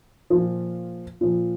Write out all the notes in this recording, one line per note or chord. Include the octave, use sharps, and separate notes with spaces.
A#2 F3
A#2 F3